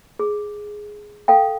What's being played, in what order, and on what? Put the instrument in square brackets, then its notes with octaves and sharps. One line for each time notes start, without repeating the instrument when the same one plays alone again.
[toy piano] G#4
A4 F5 G5